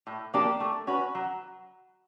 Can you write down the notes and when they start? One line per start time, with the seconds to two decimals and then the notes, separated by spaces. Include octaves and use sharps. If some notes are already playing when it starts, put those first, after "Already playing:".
0.07 A2
0.34 F3 A#3 D4 G4
0.60 A3
0.87 C#4 F#4 B4
1.15 F#3